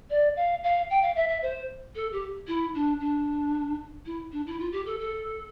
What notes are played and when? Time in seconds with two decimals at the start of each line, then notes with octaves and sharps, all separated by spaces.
0.10 D5
0.36 F5
0.63 F5
0.90 G5
1.02 F5
1.15 E5
1.28 E5
1.42 C5
1.95 A4
2.12 G4
2.47 E4
2.74 D4
3.00 D4
4.05 E4
4.32 D4
4.46 E4
4.59 F4
4.72 G4
4.86 A4
4.99 A4